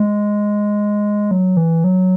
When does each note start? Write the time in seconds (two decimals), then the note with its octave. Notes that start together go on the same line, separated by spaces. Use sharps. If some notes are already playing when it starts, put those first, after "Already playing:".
Already playing: G#3
1.31 F#3
1.57 E3
1.84 F#3